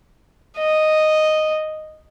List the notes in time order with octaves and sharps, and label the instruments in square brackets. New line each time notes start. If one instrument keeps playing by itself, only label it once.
[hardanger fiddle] D#5